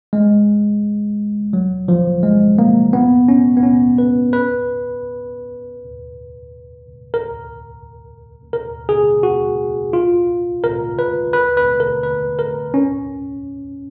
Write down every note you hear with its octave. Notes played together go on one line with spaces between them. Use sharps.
G#3
F#3
F3
G#3
A#3
B3
C#4
B3
C#4
B4
B4
A#4
A#4
G#4
F#4
F4
A#4
B4
B4
B4
A#4
B4
A#4
C#4